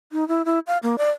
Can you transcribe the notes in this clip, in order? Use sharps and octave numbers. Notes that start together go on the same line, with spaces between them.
D#4
E4
E4
F5
A#3
D5